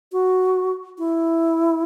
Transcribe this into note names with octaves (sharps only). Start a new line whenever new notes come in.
F#4
E4